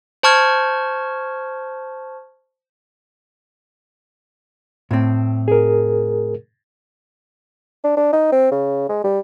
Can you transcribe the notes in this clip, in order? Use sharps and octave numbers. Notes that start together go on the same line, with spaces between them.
C5 A5 C#6 F6 G#6
A2 C4
G#4 A#4
D4
D4
D#4
C4
C#3
G#3
G3